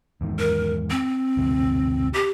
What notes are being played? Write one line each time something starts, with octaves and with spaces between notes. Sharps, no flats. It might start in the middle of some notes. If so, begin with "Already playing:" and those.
E2 G#2 D#3
A#4
C4
G1 D2 C3
G4